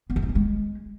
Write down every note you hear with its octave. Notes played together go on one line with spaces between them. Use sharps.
B3
E3
D#4
B3
G#3